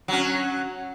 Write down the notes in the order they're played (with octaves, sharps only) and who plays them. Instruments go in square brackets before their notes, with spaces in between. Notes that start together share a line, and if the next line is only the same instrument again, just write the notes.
[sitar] F#3 C#4